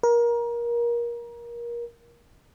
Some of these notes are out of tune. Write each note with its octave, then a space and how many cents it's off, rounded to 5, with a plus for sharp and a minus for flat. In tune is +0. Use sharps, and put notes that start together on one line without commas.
A#4 +25